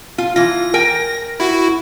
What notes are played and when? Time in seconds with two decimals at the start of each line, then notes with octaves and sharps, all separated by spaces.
0.18 F4
0.36 E3 F4 A#6
0.74 A#4 G5 G#5
1.40 E4 F#4